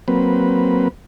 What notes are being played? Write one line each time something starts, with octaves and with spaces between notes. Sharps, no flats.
F#3 A#3 C4 B4